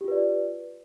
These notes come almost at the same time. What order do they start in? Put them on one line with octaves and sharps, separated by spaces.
G4 F4 B4 D5